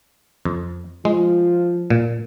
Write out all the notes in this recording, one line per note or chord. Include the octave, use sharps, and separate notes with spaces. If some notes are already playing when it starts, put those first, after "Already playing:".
F2
F3 G#3
A#2